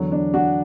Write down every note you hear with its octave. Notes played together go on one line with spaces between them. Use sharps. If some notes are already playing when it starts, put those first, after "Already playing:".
Already playing: E2 D3 F#3
D4
D4 F#4